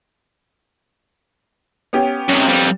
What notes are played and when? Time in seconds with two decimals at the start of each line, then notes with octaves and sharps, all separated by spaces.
1.93 B3 C#4 G4
2.29 F#2 C3
2.47 F2 G3